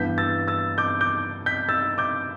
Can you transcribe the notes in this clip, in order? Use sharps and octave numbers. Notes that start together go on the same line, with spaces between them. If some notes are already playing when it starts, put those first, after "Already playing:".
Already playing: G2 E3 B3 G6 B6
E6 A6
E6 A6
D6 G6
D6 G6
G6 B6
E6 A6
D6 G6